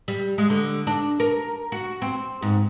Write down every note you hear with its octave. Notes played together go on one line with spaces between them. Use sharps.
G3
G#3
D3
D4
A#4
F#4
C4
G#2